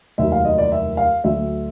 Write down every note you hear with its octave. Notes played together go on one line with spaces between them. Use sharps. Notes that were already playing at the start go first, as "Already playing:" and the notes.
F1 D#2 D#3 F#3 E5
F5
D#5
D5
E5
F5
D2 D3 F#3 E5